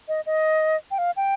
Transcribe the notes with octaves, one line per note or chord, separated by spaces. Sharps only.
D#5
D#5
G5
F5
G5